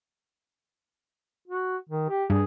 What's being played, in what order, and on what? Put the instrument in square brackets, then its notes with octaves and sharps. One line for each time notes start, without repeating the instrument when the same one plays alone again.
[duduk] F#4
D#3
G4
[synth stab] G2 [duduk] G#4